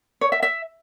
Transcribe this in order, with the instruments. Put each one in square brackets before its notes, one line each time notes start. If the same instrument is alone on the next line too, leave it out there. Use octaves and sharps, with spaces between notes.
[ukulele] C#5
E5
E5